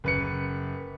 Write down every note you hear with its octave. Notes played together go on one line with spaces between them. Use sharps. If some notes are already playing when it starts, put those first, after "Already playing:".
F#1 B4 C#7